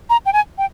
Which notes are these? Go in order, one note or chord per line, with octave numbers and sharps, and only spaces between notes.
A#5
G5
G#5
G5